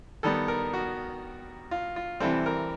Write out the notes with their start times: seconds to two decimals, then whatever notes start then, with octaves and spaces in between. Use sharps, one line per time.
0.23 D#3 G3 B3 A4
0.48 A#4
0.74 F#4
1.71 F4
1.96 F4
2.20 C3 E3 G3 C4 A4
2.46 A#4